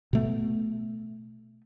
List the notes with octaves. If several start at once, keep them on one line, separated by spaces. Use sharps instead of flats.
B2 A3 B3